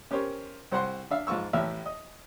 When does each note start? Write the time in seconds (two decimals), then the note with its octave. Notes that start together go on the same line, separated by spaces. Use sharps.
0.11 C#4 G4 A#4 C5 C#5
0.72 C2 C5 F#5 C6
1.11 D4 E5 F5
1.27 G#2 F3 F4 C#6 E6
1.53 A1 A2 E5 F6
1.86 D#5